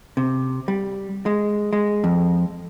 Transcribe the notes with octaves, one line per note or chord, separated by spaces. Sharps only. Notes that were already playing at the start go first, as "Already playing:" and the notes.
C3
G3
G#3
G#3
F2